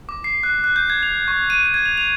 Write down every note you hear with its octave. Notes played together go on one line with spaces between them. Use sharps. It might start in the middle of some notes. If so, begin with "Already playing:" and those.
D6
C7
F#6
F#6
G6
G#6
F7
C#6
D#7
G#6
F7
F7